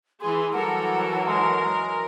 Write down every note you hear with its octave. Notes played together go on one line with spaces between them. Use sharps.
E3 G#4 G#5 C6
E3 F#3 G3 A4 A#4 F#5 A5
G#3 A#4
G#3